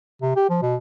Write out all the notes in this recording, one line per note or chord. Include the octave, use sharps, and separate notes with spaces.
C3
G4
F3
B2